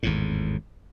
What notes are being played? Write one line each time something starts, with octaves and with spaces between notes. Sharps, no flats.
G#1 E2 A2